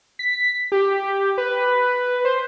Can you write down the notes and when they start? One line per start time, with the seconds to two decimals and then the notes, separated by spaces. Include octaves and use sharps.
0.19 B6
0.72 G4
1.38 B4
2.25 C5